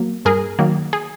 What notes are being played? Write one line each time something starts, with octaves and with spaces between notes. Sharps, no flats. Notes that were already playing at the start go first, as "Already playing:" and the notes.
Already playing: F#3 A#3
G2 G#4 A#4
D#3 F#3 A#3
G#4